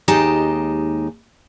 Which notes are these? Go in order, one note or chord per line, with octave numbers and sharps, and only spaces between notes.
D#2 G#3 D#4 G4 A5